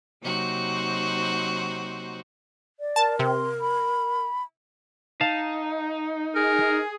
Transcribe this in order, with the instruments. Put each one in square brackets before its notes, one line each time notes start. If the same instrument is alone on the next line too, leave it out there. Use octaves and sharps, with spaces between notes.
[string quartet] C3 F#3 A#3 D#4 F#4 C5
[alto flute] D5
[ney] A#4 [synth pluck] A5
[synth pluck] C3 [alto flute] C6
[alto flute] B5
[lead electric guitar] D#4 [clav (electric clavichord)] F5 A5
[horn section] G#4 [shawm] A#4